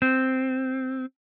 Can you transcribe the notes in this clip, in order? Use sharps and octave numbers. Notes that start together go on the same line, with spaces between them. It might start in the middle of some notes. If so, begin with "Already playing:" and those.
C4